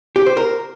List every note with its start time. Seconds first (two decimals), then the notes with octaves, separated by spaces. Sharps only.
0.16 G4
0.26 C5
0.37 A#4